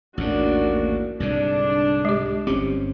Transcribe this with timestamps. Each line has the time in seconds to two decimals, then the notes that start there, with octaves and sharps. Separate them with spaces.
0.18 A1 D#2 G#2 A#3 D4 F#4
1.20 C2 G#2 D3 D4
2.05 G#3 G4
2.47 G1 C4 C#4 G4